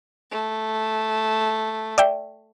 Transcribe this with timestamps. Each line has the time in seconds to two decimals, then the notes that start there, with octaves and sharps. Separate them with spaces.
0.31 A3
1.98 D5 E5 G5